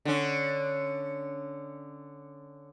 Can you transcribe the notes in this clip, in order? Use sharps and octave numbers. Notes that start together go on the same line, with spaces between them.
D3 C#4